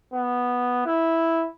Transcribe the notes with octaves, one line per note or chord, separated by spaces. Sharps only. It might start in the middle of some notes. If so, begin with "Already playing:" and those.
B3
E4